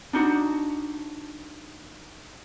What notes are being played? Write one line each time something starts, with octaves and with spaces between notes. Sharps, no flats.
D4 D#4 F#4